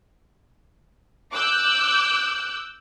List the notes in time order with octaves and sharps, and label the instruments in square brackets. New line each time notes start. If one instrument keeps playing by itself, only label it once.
[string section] D6 E6 F#6 G6